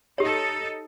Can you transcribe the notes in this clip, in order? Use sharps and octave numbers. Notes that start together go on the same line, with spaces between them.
D#4 G4 A4 C#5